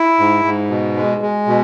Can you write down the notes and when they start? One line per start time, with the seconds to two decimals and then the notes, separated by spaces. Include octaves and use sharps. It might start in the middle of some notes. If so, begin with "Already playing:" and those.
Already playing: E4
0.19 G#2
0.45 G#2
0.70 B2
0.97 G#3
1.21 G#3
1.47 B2